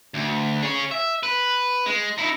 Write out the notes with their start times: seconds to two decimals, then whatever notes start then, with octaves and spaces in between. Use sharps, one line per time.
0.14 D2
0.63 G#4 C#5
0.91 E5
1.23 B4
1.86 G#3
2.18 D#4 E4